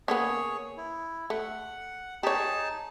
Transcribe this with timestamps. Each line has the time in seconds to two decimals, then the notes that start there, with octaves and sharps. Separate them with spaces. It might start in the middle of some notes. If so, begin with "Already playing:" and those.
0.08 C#3 A#3 B3 G#4 C#5
0.77 E4
1.30 A3 F#5
2.23 D#4 G4 G#4 C#5 A5